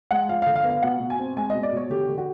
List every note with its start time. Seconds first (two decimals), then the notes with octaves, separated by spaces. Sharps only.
0.11 G#3 F#5
0.29 F3 F5
0.42 D3 F5
0.56 F5
0.64 B3
0.70 F5
0.82 B2 F#5
1.00 B2
1.10 G#5
1.19 C4
1.37 G#3 G#5
1.50 B2 D#5
1.63 D5
1.72 B2 C#5
1.90 D3 G4
2.08 D3
2.18 F#4